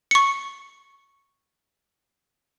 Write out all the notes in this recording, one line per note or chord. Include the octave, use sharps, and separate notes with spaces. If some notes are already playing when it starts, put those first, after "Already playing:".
C#6 C#7